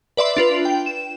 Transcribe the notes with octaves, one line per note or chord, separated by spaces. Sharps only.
B4 D5 E5 C6
D4 F4 B4
G5
E7